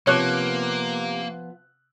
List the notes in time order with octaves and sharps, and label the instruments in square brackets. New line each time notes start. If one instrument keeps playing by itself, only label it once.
[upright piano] C3 D6 F#6 [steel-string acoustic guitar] F3 B3 C5 [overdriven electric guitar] A#3 [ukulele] C#5